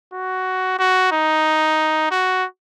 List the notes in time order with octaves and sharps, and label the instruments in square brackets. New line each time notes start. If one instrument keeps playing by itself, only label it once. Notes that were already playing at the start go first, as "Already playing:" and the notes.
[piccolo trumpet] F#4
F#4
D#4
F#4